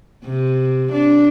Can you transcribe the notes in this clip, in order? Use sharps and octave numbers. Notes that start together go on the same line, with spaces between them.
C3
D4